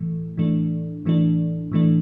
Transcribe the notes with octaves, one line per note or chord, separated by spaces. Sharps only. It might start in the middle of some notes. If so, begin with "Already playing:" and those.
Already playing: A2 E3 A3
A2 E3 A3 D4
A2 E3 A3 D4
A2 E3 A3 D4